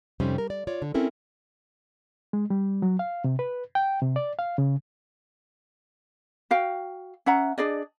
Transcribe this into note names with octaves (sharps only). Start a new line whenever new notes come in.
F2 C3 G3 C#4 D#4 C5
A#4
D5
F4 C#5 D5
D3
C4 C#4 E4 A4 A#4
G#3
G3
F#3
F5
C3
B4
G5
C3
D5
F5
C#3
F#4 F5 G5
C#4 E5 F#5 A#5
D4 G#4 D5 D#5